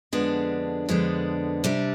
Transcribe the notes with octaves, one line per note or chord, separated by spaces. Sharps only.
F2 D3 G#3 B3 D4
F2 D3 G#3 B3 D4
C3 G3 D4